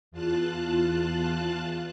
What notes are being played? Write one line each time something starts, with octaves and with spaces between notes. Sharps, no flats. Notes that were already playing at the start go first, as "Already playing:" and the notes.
E2 F4 A5 F#6